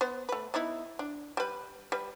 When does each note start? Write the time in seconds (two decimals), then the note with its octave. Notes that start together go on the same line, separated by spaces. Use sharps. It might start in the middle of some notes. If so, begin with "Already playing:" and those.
0.01 B3 C5
0.29 A3 B4
0.54 B3 D#4 E4
0.99 D4
1.37 G3 B4
1.92 G3 B4